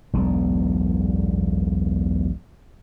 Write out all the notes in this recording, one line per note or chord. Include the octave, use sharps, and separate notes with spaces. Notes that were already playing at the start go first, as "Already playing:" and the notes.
E1 B1 G2 D3